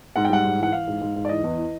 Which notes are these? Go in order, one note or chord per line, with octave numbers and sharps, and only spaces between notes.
G#2 F#5
G5
G3 F#5
G#2
E3 F#5
E3 F5
G#2
G#2
G#2
D5
E3 D#5
E2
E3